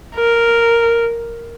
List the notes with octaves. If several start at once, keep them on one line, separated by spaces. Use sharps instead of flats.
A#4